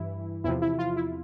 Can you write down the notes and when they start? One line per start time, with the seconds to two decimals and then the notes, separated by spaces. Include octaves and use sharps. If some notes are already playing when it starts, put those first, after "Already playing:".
Already playing: G2 E3 E4
0.44 E2 C3 F3 E4
0.62 E4
0.78 F4
0.96 E4